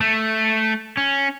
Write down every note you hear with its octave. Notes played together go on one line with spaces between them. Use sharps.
A3
C#4